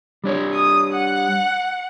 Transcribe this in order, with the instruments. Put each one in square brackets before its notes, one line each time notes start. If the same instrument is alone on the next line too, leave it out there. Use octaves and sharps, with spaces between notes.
[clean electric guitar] G3 D4 C#5
[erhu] D#6
F#5